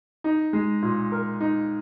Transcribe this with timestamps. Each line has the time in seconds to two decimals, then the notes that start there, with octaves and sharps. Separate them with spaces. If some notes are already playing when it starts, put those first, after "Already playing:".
0.24 D#4
0.53 G#3
0.82 A#2
1.12 A#4
1.41 D#4